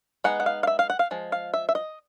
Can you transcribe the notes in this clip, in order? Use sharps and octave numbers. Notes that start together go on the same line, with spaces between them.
G#3 B3 D#4 F#5
F#5
F5
F5
E5
F5
F#5
F5
F3 G#3
F5
E5
E5
D#5